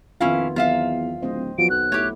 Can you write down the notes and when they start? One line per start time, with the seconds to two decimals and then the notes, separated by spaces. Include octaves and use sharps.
0.20 F2 D#3 B3 C#4 E4 F4 F5
0.56 E2 F#3 C4 D#4 F4 E5 F5
1.22 D1 C4 C5 D#5
1.59 F3 F#3 B3 F#4 D7
1.70 B1 F#6
1.92 A3 E4 G4 C#5